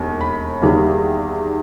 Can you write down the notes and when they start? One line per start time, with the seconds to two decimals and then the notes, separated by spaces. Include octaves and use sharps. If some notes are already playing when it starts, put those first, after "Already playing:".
Already playing: E1 D#2
0.21 B5
0.62 E2 D#3 G3 A#3